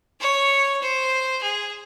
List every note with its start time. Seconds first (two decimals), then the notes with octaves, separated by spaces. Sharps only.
0.21 C#5
0.82 C5
1.43 G#4